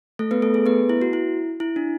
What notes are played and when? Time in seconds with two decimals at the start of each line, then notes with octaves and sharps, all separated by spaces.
0.19 A3 A4
0.31 B3 B4
0.42 A3 A4
0.54 G#4
0.66 B3 B4
0.90 E4
1.02 F#4
1.13 E4
1.60 E4
1.76 D4